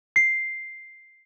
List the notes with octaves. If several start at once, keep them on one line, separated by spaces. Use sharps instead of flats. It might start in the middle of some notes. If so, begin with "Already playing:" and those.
C7